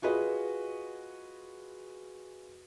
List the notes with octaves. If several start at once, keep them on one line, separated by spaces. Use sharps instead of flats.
F4 F#4 G#4 B4 D#5